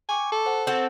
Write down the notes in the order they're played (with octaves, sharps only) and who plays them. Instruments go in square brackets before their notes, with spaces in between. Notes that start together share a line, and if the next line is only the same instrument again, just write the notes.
[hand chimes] G5 C#6 D6 [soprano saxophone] G#5
[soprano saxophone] A4
[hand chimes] C5 F#5
[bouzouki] C4 F#4 A4